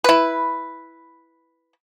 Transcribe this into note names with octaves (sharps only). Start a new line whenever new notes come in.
E4 B4